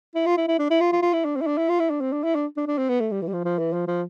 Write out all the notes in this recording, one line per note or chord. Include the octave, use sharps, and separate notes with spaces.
E4
F4
E4
E4
D4
E4
F4
F4
F4
E4
D4
C4
E4
D4
E4
F4
E4
D4
C4
D4
E4
D4
D4
D4
C4
B3
A3
G3
E3
G3
F3
F3
E3
F3
F3